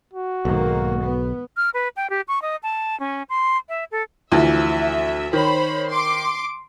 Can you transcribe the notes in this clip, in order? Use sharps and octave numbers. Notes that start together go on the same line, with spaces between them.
F#4
B1 G#2 D#3 A#3
B3
F6
B4
G5
G4
C#6
D#5
A5
C#4
C6
E5
A4
D2 E3 F3 E5
D#3 C5 C#5 B5
C6 D6